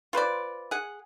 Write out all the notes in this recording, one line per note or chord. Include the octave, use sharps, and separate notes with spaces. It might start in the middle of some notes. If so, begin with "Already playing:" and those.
F4 B4 C5 D5
G#4 F#5